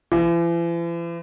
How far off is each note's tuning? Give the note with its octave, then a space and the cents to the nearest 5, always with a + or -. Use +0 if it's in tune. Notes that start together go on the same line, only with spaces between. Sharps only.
E3 +45